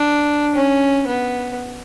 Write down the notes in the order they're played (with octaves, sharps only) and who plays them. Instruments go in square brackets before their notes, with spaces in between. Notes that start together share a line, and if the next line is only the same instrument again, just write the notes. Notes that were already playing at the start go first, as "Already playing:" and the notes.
Already playing: [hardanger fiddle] D4
C#4
B3